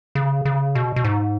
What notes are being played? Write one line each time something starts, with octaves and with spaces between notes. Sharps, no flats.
C#3
C#3
B2
B2
G#2